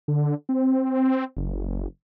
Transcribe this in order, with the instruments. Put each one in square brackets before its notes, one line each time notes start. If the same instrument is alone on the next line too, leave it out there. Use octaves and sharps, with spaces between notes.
[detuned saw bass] D3
C4
F#1